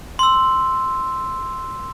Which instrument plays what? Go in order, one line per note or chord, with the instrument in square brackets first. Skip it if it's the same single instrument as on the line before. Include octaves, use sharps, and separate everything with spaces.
[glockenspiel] C6 E6